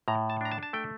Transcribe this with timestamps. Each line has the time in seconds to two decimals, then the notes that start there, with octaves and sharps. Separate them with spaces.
0.08 A2 A#5
0.30 A5
0.41 D4 A#5
0.51 A5
0.63 A5
0.73 A3 G5